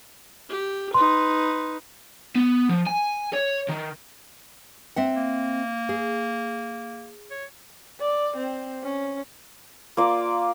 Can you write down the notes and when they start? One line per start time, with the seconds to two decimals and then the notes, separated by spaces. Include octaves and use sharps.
0.50 G4
0.94 D#4 B4 C6
2.36 B3
2.69 F3
2.86 G#5
3.34 C#5
3.69 D#3
4.96 C4 E5 F#5
5.17 A#3
5.89 G#4
7.31 C#5
8.00 D5
8.37 C4
8.84 C#4
9.97 A#3 F4 D5